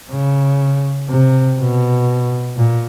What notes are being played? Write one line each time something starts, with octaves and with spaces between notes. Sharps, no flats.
C#3
C3
B2
A#2